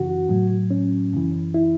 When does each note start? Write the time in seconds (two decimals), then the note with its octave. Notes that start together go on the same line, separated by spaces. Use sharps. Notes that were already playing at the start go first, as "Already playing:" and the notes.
Already playing: F#2 C#3 E3 F#4
0.29 A2 F#3
0.71 C#4
1.12 F#2 C#3 E3
1.54 E4